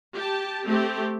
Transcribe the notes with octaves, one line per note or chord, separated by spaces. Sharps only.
G4 A5
A3 C4 G4